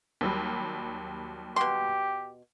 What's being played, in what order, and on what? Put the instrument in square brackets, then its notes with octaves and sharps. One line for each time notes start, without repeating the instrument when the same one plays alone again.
[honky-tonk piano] D#2 F#3 G3
[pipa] B2 C6 [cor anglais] G4